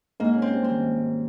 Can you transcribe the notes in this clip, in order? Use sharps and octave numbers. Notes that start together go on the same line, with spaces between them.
G#2 A#3
C#4
C4
G3
C4
G#1
G#2
C#4